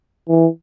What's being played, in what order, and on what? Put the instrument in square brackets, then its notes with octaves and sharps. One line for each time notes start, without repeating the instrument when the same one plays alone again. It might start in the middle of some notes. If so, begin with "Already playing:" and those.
[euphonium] E3